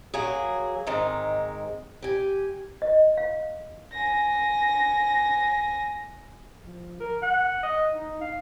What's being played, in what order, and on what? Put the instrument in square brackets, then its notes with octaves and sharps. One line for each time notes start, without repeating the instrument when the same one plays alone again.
[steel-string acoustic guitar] F#3 A#3 G#4
G#2 D#3 G#3 C4
G4 G#5
[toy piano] D#5
F5
[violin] G#5 A#6
[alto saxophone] F3
A#4
F#5
D#5
D#4
F5